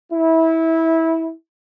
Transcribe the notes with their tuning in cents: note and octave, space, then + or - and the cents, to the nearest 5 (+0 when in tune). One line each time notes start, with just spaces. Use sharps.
E4 -20